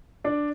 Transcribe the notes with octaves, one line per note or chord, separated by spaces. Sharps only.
D4 D5